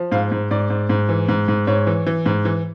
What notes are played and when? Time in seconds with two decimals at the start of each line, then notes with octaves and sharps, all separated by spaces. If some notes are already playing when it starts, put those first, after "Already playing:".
Already playing: F3
0.12 G#2 F5
0.32 G#2
0.51 G#2 D5
0.70 G#2
0.89 G#2
1.09 E3
1.29 G#2
1.48 G#2
1.67 G#2 C#5
1.87 E3
2.06 E3
2.26 G#2
2.45 E3